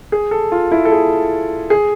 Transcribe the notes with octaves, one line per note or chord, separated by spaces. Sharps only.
G#4
A4
F4
E4
A4
G#4
G#4